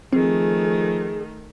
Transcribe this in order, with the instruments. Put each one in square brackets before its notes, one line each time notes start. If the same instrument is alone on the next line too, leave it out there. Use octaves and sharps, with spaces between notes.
[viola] D#3 A3 [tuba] F3 [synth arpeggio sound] C4 [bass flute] G#4